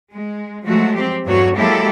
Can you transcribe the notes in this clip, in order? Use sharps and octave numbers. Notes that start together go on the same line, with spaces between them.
G#3
F3 F#3 G#3 A3 F#4
C4 G4
E2 G2 F#3 A3 F#4 C#5
F#3 G#3 A#3 E4 G4 A4